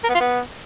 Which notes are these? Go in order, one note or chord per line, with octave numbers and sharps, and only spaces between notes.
A#4
B3
F4
B3